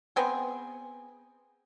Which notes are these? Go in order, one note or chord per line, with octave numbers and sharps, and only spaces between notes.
B3 C4 G#4